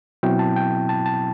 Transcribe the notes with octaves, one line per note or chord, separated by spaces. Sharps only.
B2 F#3 C4 E4 G5
A5
G5
A5
A5